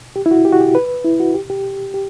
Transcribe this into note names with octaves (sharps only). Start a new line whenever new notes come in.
G4
E4
F#4
G4
F#4
G4
B4
E4
F#4
G4
G4
G4